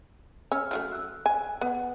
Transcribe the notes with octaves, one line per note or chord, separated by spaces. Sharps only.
C#4 E6 F6
F3 F#3 A3
E6 F#6
G#5
B3 B4 F#5